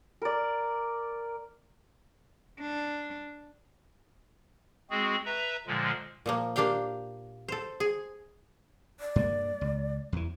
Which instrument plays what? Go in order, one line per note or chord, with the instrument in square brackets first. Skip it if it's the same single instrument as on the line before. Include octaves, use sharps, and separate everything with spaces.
[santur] A#4 D5
[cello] D4
[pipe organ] G#3 C4 F#4 G#4
B4 E5 A#5
A#2 D3 F3 G#3
[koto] A#2 F3 A#3
A#3 D4 G4 F5 G5
A4 C5
G#4
[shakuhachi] D5
[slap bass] G2 A#3
C#2
E2 E3